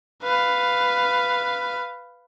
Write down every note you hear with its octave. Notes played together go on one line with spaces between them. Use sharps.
B4 F5